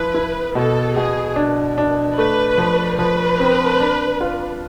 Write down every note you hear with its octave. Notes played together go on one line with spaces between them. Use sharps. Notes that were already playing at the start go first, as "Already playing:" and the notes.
Already playing: F3 E4 B4
E4
B2 A4
B2 G#4
D4
D4
A3 B4
F3
F3 B4
C4
D4
F4